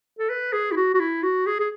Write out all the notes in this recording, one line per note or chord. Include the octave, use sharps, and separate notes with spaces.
A4
B4
G#4
E4
F#4
F#4
E4
F#4
G#4
G#4